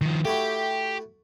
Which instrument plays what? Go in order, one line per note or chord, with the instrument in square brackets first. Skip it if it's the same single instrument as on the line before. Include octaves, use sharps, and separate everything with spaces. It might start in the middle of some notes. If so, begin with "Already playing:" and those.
[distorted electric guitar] D#3 F3
[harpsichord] A3 E4 F#4 [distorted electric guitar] G4